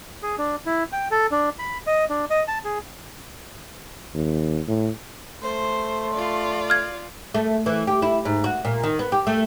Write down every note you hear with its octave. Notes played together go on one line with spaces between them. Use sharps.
G#4
D4
E4
G5
A4
D4
B5
D#5
D4
D#5
A5
G#4
D#2
A2
A3 C5 C6
F4 D5
F6 G#6
A3
E3
G4
E4
G#2
F#4
A#2
D#3
B3
G4
A3